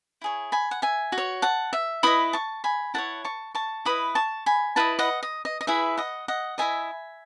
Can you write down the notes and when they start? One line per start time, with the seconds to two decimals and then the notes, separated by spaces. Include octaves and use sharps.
0.21 E4 G#4 C#5
0.52 G#5 B5
0.71 F#5
0.82 E5 G#5
1.12 F#4
1.18 C#5
1.42 F#5 A5
1.73 E5
2.03 E4 B4 D#5 B5 D#6
2.33 A5 C#6
2.64 G#5 B5
2.94 E4 A4 C#5 F#5 A5
3.24 A5 C#6
3.55 A5 C#6
3.85 E4 B4 D#5 B5 D#6
4.15 A5 C#6
4.46 G#5 B5
4.76 E4 B4 D#5 F#5 A5
4.99 D#5 F#5
5.23 D#5
5.45 D#5
5.61 D#5
5.67 E4 G#4 B4 E5
5.97 D#5 F#5
6.28 D#5 F#5
6.58 E4 B4 D#5 E5 G#5